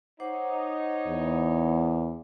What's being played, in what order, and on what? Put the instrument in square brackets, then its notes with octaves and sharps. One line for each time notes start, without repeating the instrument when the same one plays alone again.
[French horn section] D#4 C#5 [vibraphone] C5 F#5 D6
[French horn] E2